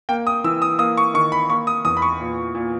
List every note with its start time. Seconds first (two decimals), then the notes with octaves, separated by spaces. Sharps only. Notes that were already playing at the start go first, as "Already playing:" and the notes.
0.09 A#3 G5
0.27 D#6
0.44 E3 E6
0.62 D#6
0.79 A#3 D#6
0.97 C#6
1.14 D#3 C#6
1.32 B5
1.50 A#3 C#6
1.67 D#6
1.85 E2 D#6
1.97 B5
2.02 C#6
2.21 A#2
2.55 A#2